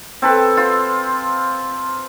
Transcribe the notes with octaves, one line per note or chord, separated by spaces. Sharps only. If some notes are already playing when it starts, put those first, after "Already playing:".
C4 A4 B4
F4 C5